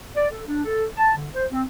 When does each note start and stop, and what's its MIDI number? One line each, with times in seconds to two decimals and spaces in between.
0.17 0.27 74
0.31 0.41 69
0.47 0.61 62
0.65 0.85 69
0.97 1.12 81
1.16 1.29 50
1.35 1.46 72
1.52 1.63 60